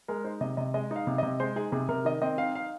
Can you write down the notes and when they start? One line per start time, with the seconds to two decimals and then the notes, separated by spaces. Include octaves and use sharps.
0.08 G#3 A#4
0.24 D#4 C5
0.41 C3 D#5
0.57 C3 D#5
0.74 G#3 D#5
0.91 D#4 F5
1.07 C3
1.18 C3 D#5
1.40 G#3 C5
1.56 D#4 G#4
1.72 C3 G#4
1.89 C3 A#4
2.05 D#3 D#5
2.22 C4 D#5
2.38 D#4 F5
2.55 F5